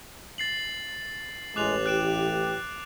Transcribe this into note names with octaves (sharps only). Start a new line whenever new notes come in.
A6 C7 F#7
A1 G#3 D6 F#6 F7
G4 F#6 D7 E7